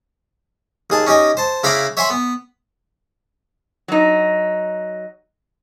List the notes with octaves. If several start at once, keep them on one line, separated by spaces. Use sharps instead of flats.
D#2 G#4 A5
C#4 D#4 G4 D#5 G#5
C5 A5
C#3 E4 F5 A#5 B5 D6
C#5 E5 F#5 G#5 B5 C6
B3
F#3 D#4